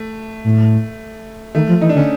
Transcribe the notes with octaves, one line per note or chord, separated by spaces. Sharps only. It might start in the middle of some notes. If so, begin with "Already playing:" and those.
Already playing: A3
A2
D#3 A3
F3
E3 D#4
D4
D3 C#4